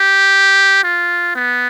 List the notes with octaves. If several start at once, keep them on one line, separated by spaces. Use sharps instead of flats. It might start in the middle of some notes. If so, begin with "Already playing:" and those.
Already playing: G4
F4
B3